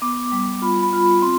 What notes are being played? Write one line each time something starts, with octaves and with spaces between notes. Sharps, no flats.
B3 D6
G3
F4 B5
B5
F4
B5
C4 C6